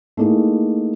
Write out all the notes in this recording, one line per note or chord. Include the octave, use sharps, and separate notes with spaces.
A3 A#3 D#4 E4 G#4